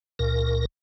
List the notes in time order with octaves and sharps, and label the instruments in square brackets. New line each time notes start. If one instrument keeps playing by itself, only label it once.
[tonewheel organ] C#2 A#2 A#4